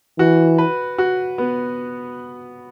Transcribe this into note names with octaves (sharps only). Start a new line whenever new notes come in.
E3 F#4
B4
F#4
B3